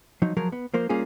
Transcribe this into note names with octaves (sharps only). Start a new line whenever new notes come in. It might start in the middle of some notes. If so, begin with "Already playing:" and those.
F3 F#3 D#4
F3 F#3 G#4 A#4
B3
F3 A#3 A#4 C5
G3 A#3 C#4 F4 G#4